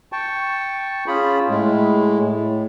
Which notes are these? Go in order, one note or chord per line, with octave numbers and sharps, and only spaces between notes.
G5 A5 C#6
C#4 F4 G#4 B5
A2 G#3
A2